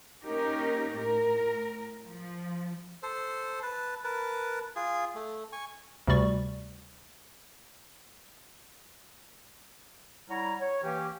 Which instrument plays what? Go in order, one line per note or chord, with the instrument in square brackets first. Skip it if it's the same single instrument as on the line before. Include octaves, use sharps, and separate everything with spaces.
[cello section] A#3 C#4 D#4 G4 A#4
A2 A#4
F3
[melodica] A4 C5
B4 A5
A#4 B4 A5
F4 G#4
A3
G#5 C#6
[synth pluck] D2 C3 G3 D5 C#6
[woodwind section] G3 E4 C#5 F#5 A#5
C#5
E3 A#3 C#4 G4